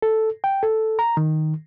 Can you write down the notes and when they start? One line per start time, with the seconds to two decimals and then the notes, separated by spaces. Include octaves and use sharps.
0.02 A4
0.44 G5
0.63 A4
0.99 A#5
1.17 D#3